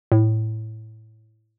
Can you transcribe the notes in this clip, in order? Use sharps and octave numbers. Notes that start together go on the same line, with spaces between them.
A2